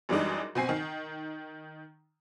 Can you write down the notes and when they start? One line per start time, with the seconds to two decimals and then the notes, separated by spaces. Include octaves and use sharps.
0.09 F#2 E3 G3 G#3 D4 D#4
0.55 B2 C4 G#5 C7
0.69 D#3